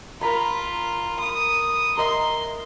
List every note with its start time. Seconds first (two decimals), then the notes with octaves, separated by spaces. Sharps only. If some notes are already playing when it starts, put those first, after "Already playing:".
0.21 F4 A#4 B5 C6
1.19 D#6
1.97 A#4 D#5 E5 C6